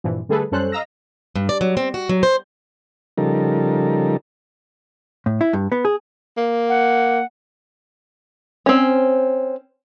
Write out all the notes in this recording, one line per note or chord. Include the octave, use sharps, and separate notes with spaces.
G2 A#2 E3 F3
D3 G3 A3 G#4 A4 B4
F#2 G3 C#4 A4 C5 F#6
D#5 F5 A#5 E6 A#6
G2
D5
F#3
C4
F#4
F#3
C5
C#3 F3 G3 D#4 A4 A#4
A2
E4
G2
B3
G#4
A#3
F#5
C4 C#4